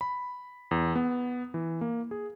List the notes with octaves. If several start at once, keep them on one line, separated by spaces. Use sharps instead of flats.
B5
E2
B3
E3
A#3
G#4